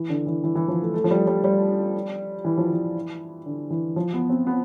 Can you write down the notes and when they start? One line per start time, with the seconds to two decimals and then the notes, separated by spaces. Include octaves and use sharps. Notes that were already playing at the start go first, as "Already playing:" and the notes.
Already playing: E3
0.09 D3
0.26 E3
0.44 E3
0.55 E3
0.68 F3
0.81 A3
0.94 A3
1.04 F3
1.11 G3
1.27 G3
1.44 G3
2.45 E3
2.57 F3
2.70 E3
3.46 D3
3.70 E3
3.96 F3
4.13 B3
4.30 C4
4.47 B3